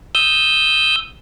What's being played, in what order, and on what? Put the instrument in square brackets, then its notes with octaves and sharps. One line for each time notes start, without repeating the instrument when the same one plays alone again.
[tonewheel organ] D#6 E6 G6